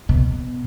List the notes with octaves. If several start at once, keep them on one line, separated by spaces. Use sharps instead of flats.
B2